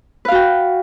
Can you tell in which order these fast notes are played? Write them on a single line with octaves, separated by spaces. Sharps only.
B4 F5 F#4 G5